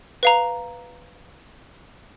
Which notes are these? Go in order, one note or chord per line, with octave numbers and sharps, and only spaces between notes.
B4 F5 A#5